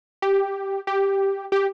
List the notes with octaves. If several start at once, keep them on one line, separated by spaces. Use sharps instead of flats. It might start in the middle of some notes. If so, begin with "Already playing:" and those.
G4
G4
G4